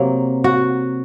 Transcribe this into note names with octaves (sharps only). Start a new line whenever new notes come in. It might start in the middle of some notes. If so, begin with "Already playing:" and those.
Already playing: C3 F#3 A#3
F#4